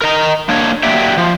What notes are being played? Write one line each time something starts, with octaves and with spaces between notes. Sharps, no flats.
A#4 D#5 A#5
A#3 D4 C#5
F#3 A#3 G4 D5 E5
F3